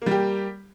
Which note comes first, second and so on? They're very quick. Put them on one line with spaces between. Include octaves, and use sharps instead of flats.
A#3 G3 G4